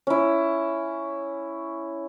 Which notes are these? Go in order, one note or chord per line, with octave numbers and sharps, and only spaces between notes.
C#4 E4